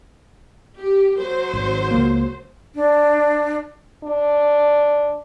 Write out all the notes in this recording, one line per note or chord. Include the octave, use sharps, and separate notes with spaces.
G4
F#3 C5
G#1
C#2 A#3
D4
D4